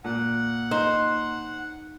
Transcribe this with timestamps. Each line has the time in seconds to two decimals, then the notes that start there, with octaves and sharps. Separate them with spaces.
0.04 A#2 F#5
0.71 D#4 C5